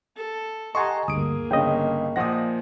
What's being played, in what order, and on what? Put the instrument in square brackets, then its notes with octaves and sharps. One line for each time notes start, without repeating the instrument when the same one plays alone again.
[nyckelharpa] A4
[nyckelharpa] G4 A4 [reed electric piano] D#5 G#5 A#5 [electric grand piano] F#5 C6 C#6
[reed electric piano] D2 G2 [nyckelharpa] A#3 G#4 [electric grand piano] D#6 D7
[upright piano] G1 C#3 [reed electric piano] D#5 G5
[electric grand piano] A#2 F3 A#6 [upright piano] F#5 D#6